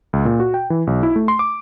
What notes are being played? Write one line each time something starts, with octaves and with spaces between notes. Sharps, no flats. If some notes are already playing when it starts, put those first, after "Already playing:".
C#2
A#2
F#4
G5
E3
B1
E4
A3
C6
D6